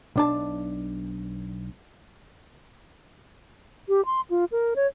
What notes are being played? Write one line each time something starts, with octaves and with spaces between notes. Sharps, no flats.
B1 D4 A5
G4
C6
F4
A#4
C#5